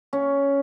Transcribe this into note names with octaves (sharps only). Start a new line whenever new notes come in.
C#4